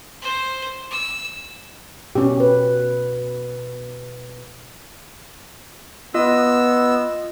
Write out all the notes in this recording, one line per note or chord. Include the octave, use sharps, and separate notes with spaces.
C5
E6
B2 C#4 G4
B4
B3 F4 D#5 E6